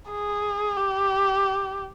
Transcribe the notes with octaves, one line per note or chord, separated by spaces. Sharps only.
G#4
G4